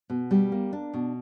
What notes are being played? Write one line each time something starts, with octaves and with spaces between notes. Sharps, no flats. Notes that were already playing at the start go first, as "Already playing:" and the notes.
B2
G3
A#3
D4
B2